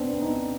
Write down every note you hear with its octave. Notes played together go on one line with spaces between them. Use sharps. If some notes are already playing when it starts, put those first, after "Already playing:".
Already playing: B3 C4 D4
C4 D#4